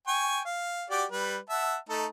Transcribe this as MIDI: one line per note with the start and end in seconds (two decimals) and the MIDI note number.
0.07 0.40 79
0.07 0.40 80
0.07 0.40 85
0.45 0.85 77
0.90 1.05 66
0.90 1.05 67
0.90 1.05 74
1.11 1.37 55
1.11 1.37 71
1.50 1.76 76
1.50 1.76 78
1.50 1.76 81
1.89 2.06 57
1.89 2.06 63
1.89 2.06 69